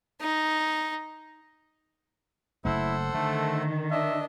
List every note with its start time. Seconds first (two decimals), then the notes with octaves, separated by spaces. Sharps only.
0.21 D#4
2.65 F#1 A3 E4 A4 C5 F#5
3.14 D3 D#3 A3
3.91 D4 D#5 E5